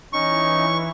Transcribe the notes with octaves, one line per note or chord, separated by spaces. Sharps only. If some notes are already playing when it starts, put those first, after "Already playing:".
E3 C#4 D#4 C#6